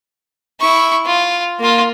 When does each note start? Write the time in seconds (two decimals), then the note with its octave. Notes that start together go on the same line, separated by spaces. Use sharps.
0.60 E4 C#6
1.06 F4
1.59 A#3 F4